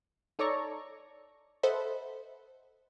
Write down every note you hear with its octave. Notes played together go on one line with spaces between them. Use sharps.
D#4 A4 C#5 D5 A#5 C#6
A4 C5 D#5 E5 F#5 B5